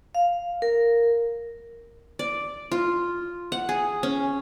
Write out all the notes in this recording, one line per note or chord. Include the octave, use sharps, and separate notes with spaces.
F5
A#4
D5
F4
F#5
G#4
C#4